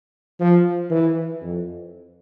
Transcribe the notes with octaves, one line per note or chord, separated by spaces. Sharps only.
F3
E3
F2